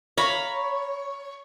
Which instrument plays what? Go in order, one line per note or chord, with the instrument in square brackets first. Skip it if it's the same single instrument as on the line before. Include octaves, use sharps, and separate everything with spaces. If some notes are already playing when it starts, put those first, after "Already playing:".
[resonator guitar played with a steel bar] C#5 [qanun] F5 A#5 B5